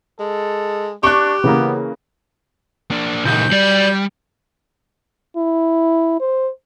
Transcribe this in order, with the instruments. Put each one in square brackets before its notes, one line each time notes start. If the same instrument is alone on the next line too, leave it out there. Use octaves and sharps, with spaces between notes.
[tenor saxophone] G#3 [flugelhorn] A4
[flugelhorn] D4 [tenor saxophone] G4 [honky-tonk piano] C#6 F#6
[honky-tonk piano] C#3 [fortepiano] E3 A#3 [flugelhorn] B3
[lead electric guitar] A#3 D4
[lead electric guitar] C#2 D#4 [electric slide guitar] A#2 E3 [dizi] G6
[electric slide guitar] F#3 D5 [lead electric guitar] G3
[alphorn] E4
C5